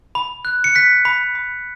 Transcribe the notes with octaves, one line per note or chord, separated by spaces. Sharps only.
B5
F#6
C#7
F#6 B6
B5
B5